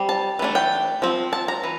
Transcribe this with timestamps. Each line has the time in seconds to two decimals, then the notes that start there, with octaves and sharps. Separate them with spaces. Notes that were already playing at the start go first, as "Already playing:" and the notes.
Already playing: G3 C4
0.09 A5
0.39 E3 A3 D4
0.55 G5
1.02 F3 C4
1.33 A5
1.48 A#5
1.64 E3